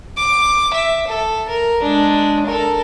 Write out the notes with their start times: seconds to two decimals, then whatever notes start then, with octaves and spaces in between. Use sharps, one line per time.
0.17 D6
0.73 E5
1.07 A4
1.49 A#4
1.82 G#3 D4
2.46 A4 A#4